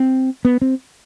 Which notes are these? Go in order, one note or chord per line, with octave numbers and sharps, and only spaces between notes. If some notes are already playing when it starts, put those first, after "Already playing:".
Already playing: C4
B3
C4